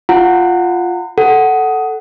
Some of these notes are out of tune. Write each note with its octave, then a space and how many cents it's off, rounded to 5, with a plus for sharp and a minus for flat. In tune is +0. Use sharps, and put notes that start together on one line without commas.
F4 +0 F#5 +0 A#5 -35
A4 +0 F#5 +10